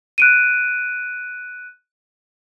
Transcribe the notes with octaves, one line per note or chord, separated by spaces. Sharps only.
F#6 D7 D#7